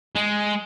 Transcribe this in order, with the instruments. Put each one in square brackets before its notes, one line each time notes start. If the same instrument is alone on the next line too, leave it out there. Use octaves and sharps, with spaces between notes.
[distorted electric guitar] G#3